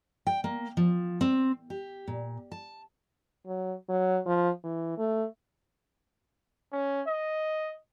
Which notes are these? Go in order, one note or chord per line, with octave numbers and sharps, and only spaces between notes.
G5
A#3
F3
C4
G4
A#2
A5
F#3
F#3
F3
E3
A3
C#4
D#5